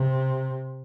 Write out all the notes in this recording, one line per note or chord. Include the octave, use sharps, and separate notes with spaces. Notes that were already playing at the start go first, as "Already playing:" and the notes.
Already playing: C3